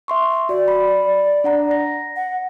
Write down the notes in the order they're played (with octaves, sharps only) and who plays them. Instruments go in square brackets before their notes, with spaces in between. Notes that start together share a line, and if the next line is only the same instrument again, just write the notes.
[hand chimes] E5 C6 C#6
[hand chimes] F#4 [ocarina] D5
[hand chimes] B5
D4 F#5 A#5
A#6
[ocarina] F#5